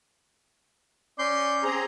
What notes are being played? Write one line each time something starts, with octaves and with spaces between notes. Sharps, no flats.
C#4 D5 C6 G6
C4 G#4 A#5